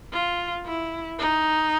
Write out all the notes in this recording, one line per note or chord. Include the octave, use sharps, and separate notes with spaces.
F4
E4
D#4